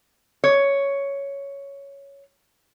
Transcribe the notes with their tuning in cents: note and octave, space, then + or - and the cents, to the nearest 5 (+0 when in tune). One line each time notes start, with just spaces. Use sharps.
C#5 +5